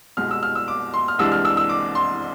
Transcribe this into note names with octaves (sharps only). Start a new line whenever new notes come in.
C2 B2 G#3 F6
E6
F6
E6
D6
C6
F6
C2 C3 E3 G#3 D4 E6
F6
E6
E6
D6
C6